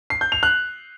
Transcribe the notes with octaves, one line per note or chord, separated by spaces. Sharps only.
C7
G6
F7
F#6